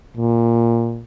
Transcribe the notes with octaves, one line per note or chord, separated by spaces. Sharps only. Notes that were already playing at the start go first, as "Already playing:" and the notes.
A#2